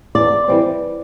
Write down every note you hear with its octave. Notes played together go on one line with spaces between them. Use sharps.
E2 D5
E3 G3 C4